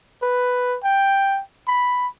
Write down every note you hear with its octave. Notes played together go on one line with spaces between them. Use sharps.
B4
G5
B5